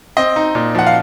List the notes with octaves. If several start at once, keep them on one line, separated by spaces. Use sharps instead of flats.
C4 D#5
D#4
A#2
F3 F#5
F5